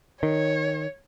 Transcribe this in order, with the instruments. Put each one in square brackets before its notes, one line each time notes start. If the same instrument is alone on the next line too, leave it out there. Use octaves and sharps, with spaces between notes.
[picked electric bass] D#3 [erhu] C#5